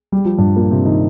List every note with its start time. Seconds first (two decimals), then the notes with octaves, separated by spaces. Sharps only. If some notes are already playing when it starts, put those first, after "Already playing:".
0.12 G3
0.25 F3
0.38 G2 G3
0.56 A#2 A#3
0.71 C3 C4
0.85 D#3 D#4